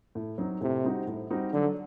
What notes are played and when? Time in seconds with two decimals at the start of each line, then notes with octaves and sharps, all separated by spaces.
0.15 A2
0.38 F#3 C4 D#4
0.61 A2 C3
0.84 G3 C4 D#4 F#4
1.07 A2
1.30 G3 C4 D#4 F#4
1.53 D3 F#3